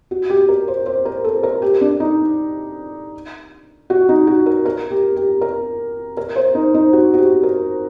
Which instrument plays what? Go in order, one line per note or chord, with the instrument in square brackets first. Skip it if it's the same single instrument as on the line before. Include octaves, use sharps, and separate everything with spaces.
[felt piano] F#4
G4
A#4
C5
C5
A#4
A4
A#4
G4
D4
D#4
F#4
D#4
F#4
A#4
A#4
G4
G4
A#4
A#4
C5
D#4
D#4
F#4
F#4
G4
A#4